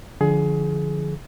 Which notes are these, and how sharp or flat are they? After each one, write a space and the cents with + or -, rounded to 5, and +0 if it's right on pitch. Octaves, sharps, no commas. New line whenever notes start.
D3 +0 F3 -10 G#4 +20